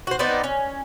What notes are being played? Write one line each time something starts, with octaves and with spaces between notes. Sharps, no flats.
F#4 C5
B3 C4 D#4 D5
C#4